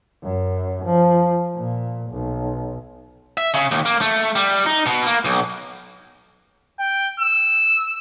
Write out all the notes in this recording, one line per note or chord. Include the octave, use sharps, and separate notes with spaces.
F#2
F3
A#2
B1
E5
C#3
D#2
A#3
A3
G3
D#4
B2
A#3
B1
G5
E6